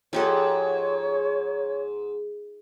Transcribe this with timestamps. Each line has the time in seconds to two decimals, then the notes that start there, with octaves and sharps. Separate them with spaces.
0.13 G#2 F3 G4 A4 C#5